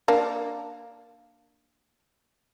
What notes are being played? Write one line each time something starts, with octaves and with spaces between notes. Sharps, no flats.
A#3 D4